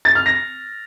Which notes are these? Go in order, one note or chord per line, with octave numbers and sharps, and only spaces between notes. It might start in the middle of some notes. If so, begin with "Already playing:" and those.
A6
F6
A#6